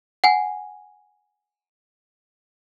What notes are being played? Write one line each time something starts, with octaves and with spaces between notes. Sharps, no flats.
F#5 G#5